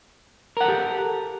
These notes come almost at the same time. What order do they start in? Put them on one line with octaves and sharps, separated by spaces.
A#4 F#5 A4 G4